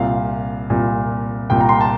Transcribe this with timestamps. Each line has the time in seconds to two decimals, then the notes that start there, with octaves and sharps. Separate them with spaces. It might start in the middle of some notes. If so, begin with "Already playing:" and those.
Already playing: C2 A#2 F5
0.70 C2 A#2
1.50 C2 A#2 G5
1.61 A#5
1.69 C6
1.81 A5